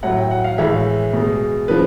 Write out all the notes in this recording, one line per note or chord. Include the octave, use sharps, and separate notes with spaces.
A2 F#3 F#5
G5
F#5
F5
A2 E3 G#3 E5
B2 G#3
C#3 F3 G#3 B4